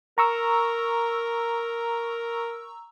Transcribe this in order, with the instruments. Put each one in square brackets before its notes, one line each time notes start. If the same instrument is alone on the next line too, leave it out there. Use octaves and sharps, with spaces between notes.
[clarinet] A#4 [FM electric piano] A#5 C#6 E6